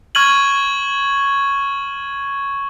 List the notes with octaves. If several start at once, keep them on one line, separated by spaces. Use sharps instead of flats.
C#6 F6 G#6 D#7 F#7